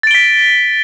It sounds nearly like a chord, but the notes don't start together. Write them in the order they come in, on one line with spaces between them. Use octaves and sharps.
A6 D7 G7 B6